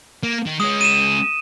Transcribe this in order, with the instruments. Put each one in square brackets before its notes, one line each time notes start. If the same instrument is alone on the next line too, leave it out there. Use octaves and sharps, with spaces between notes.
[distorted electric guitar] A#3
D#3
[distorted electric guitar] G#3 C#4 [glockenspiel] D#6
[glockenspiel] D#7 E7